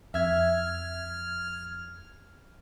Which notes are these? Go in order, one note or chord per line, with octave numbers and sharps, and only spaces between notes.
F2 E5 F6 G#6